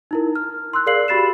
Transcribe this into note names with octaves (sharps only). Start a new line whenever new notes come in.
D#4 E4 A#4
F6
C6 E6 F#6
G#4 A#4 D5 F5 C7 F#7
F#4 G4 B5 A6 C7 E7